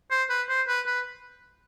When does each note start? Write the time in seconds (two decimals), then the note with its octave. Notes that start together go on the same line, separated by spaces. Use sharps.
0.11 C5
0.30 B4
0.49 C5
0.68 B4
0.87 B4